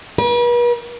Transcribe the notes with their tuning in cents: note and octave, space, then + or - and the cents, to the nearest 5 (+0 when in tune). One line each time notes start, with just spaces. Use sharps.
B4 -45